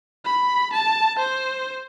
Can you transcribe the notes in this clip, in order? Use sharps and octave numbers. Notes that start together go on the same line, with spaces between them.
B5
A5
C5